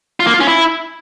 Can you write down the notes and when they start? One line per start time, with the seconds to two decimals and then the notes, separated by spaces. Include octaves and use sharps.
0.20 F4
0.27 A#3
0.33 F4
0.40 C#4
0.47 E4